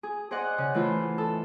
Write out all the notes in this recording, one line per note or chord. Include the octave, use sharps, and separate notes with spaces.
G#4
G#4 C5 D5 D#5 F#5
C#3
E3 A3 F4 C5
A4